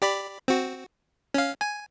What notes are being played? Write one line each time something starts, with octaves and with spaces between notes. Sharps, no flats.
G4 D5 B5
C4 F#4
C#4 F5
G#5